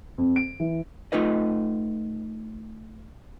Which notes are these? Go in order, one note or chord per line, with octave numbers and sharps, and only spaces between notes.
F2
D7
E3
A3 D#4 F4 B4 D#5